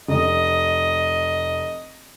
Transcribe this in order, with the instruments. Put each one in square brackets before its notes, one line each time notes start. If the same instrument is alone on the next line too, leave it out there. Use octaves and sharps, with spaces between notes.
[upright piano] F1 D#6 [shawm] D#5